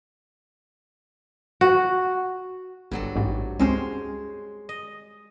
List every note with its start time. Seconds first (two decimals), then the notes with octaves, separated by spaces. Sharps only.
1.61 F#4
2.91 G1 G2 F#3 A4
3.15 A1 G#2
3.59 C#2 G#3 C4 C#4 C5 C#5
4.69 D#5